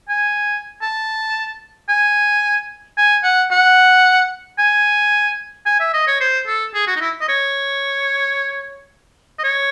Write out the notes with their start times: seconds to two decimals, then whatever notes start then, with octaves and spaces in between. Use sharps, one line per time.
0.09 G#5
0.82 A5
1.89 G#5
2.98 G#5
3.24 F#5
3.51 F#5
4.59 G#5
5.66 G#5
5.80 E5
5.94 D#5
6.08 C#5
6.21 C5
6.47 A4
6.74 G#4
6.87 F#4
6.97 D#4
7.01 E4
7.21 D#5
7.29 C#5
9.39 D#5
9.44 C#5